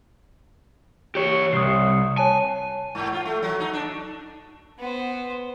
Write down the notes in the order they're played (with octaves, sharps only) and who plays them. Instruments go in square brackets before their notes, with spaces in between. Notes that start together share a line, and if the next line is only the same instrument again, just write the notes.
[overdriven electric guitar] G4 C#5
[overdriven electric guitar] C2 [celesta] D#6 C7
[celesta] C#5 A5 [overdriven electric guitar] G#5
[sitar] G#2
F4
A3
F#3
D#4
D4
[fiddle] B3 C5